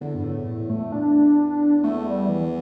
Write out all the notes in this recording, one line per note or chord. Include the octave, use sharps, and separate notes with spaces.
E2 D3
G2
A2
A2
A3
D4
E2 A3
G3
E3